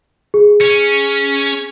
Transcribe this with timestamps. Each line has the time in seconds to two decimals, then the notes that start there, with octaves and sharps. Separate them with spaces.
0.34 G#4
0.61 C#4